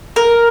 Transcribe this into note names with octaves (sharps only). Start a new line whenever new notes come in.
A#4